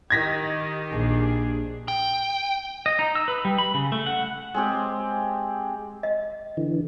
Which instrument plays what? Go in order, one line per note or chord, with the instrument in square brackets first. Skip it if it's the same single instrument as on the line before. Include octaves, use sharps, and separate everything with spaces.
[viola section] D#3 G4 [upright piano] G#6 A#6 B6
[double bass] A#1 [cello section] D4 G#4
[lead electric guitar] G5
[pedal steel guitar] D#5
D#4
E6
B4
G3
B5
C#3
A3
F#5
[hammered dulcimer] G#3 C4 G4
[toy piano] D#5
[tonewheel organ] D3 E3